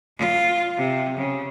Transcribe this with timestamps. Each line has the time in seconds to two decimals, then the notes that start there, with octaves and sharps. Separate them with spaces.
0.17 F4
0.77 C3
1.17 C#3